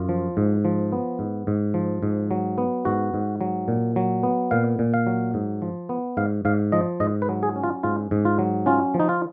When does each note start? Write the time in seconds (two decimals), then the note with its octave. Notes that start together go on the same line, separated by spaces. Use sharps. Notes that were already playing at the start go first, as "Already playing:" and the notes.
Already playing: F#2 F4
0.09 F3
0.37 G#2
0.65 F3
0.92 B3
1.19 G#2
1.47 G#2
1.74 F3
2.03 G#2
2.31 F#3
2.58 B3
2.85 G#2 F#4
3.14 G#2
3.41 F#3
3.68 A#2
3.96 F#3
4.23 B3
4.51 A#2 F5
4.79 A#2
4.94 F5
5.07 F#3
5.34 G#2
5.62 F3
5.89 B3
6.17 G#2 F5
6.45 G#2 F5
6.72 F3 D#5
7.00 G#2 D#5
7.22 B4
7.29 F#3
7.43 G#4
7.56 C#4
7.64 F4
7.83 G#2 F4
8.11 G#2
8.25 F4
8.39 F#3
8.66 C#4 F4
8.94 F3
8.99 D#4
9.09 F4